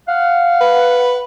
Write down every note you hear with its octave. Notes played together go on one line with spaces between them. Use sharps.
F5 F#5
B4